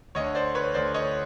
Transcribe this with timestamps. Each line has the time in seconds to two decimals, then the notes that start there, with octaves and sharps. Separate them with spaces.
0.15 D2 D3 C#5 D#5
0.35 C5 D5
0.55 B4 C#5
0.74 D2 D3 C5 D5
0.94 C#5 D#5